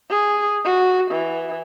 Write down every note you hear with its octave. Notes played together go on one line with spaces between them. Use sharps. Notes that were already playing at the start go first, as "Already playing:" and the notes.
G#4
F#4
E3